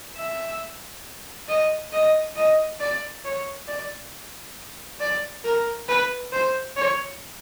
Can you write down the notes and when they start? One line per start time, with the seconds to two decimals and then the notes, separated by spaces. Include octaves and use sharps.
0.16 E5
1.48 D#5
1.92 D#5
2.36 D#5
2.80 D5
3.25 C#5
3.68 D5
5.00 D5
5.44 A#4
5.88 B4
6.32 C5
6.77 C#5